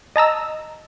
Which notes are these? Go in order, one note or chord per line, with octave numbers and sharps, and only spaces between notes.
D#5 A5 A#5 E6